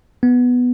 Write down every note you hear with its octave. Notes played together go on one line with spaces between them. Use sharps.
B3